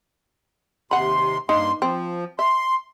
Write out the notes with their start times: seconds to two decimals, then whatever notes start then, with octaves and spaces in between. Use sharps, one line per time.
0.91 D#2 C3 F#5 B5 C6
1.49 G2 A#3 D#4 C6
1.82 F3 C4
2.39 E5 C6